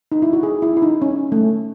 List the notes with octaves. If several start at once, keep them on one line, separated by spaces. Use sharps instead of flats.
D#4
E4
F#4
G#4
E4
E4
D#4
C#4
A3